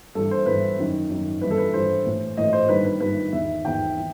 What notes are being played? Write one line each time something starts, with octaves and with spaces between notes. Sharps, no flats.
G2 E3 A4
C5
G2 E3 B4
F#2 D#3
F#2 D#3
G2 E3 B4
A4
B4
G2 E3 C5
A2 E3
A2 E3 D#5
C5
G2 D#3 B4
B4
G2 D#3 B4
E2 D#3 E5
E2 D#3 G5
E3